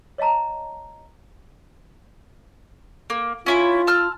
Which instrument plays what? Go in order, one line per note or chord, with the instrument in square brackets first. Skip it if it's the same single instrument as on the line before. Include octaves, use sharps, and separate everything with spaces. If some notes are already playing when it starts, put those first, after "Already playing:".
[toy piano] C#5 D#5 F5 A5 A#5
[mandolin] A#3
[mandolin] C#4 E4 B5 [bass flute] F4
[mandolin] A5 E6 F6